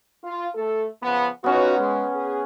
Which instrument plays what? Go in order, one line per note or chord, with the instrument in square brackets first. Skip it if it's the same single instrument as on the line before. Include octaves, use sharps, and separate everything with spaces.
[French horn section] F4
A3 A4
C#3 F3 B3
[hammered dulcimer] B3 C#4 [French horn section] D#4 F4 F#4
[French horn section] G#3
G#4